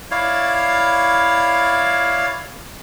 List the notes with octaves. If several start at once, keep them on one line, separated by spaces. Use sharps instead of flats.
E4 C#5 D5 F5